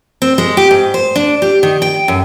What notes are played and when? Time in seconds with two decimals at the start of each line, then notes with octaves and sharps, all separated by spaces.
0.22 C4
0.38 G#3
0.57 G4
0.71 G#2
0.94 C5
1.16 D4
1.42 G4
1.63 D#3
1.82 G5
2.08 F#2